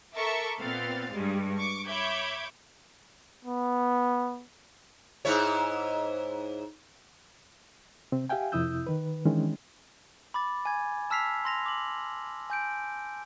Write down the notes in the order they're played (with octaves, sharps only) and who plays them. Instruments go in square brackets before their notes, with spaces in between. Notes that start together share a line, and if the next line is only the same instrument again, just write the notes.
[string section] A4 A#4 E5 A5 C#6 D6
A#2 B3 C4 F5 A6
G2 G3 G#3
C#6 D6
C#5 E5 B5 D6 G6 G#6
[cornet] B3
[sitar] G#2 E4 C#5
[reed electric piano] C3 C4
G4 E5 F5 G5 G#5
F2 C3 E4 D#6 E6 G6
D#3 B4
D#3 E3 G#3 C#4 D4
[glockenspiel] B5 D6 A6
G#5 G#6
A5 E6 F6 B6 C7 F7
C6 A#6 F7
D6 F#7
G#5 G6 D7